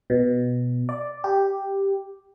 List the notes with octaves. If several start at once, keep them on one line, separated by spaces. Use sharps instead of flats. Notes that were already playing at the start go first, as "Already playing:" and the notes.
B2
D5
G4